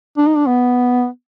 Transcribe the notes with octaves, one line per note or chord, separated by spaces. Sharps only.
D4
D#4
D4
B3